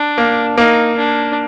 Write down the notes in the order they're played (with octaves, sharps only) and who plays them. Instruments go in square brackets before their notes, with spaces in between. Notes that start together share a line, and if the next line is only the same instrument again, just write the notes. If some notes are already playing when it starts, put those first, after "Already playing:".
Already playing: [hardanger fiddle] D4
[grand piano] A#3
[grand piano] A#3 [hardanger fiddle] D#4
[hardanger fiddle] D4